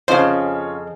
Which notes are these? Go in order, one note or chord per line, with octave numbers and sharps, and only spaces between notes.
F2 C#3 C#4 F4 C5 C#5 D#5